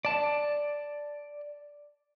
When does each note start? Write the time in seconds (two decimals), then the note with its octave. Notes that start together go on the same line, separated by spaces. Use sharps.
0.05 D5 A5